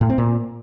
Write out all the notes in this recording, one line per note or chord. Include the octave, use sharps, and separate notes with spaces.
A2
C4
A#2